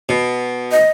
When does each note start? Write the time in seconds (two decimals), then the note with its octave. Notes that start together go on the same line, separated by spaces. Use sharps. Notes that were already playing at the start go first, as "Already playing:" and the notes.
0.09 B2
0.72 D#5